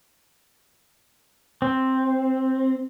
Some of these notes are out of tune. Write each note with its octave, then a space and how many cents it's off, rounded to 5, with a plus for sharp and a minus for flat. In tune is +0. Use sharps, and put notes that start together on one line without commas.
C4 +5